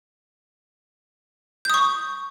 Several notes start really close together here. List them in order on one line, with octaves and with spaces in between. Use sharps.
G6 D#6 C#6